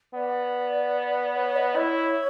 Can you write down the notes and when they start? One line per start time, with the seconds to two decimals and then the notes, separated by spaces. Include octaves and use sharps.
0.14 B3 D5
1.35 C#5
1.56 D#5
1.76 E4 C#5